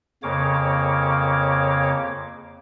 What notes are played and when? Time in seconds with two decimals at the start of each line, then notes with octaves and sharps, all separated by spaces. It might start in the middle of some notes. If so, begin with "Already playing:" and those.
0.23 F2 C#3 A#3 C#5 D6